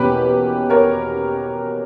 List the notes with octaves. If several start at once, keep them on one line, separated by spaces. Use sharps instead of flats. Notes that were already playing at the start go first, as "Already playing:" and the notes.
Already playing: E2 B2 A#3 C#4 G4 B4
A#4 C#5